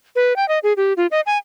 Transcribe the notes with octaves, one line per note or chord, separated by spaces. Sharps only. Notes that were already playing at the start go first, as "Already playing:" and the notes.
B4
G5
D#5
G#4
G4
F4
D#5
G#5